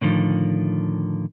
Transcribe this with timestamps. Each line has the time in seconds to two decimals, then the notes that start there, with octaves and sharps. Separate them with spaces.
0.01 A2 D3 D#3 F3